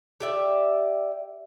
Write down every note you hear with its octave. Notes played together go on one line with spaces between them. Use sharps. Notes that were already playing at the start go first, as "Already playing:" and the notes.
G4 D5 E5